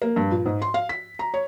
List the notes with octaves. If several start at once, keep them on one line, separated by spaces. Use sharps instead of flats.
A#3
G2
A#2
G#2
C6
F5
B6
A#5
C#5